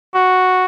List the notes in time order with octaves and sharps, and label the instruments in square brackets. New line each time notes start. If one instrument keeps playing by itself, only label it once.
[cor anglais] F#4